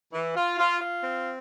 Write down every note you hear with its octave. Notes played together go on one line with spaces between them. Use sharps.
E3
F4
F4
F4
C4